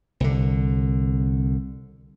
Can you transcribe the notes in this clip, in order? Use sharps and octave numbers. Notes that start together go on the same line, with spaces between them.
C2 D3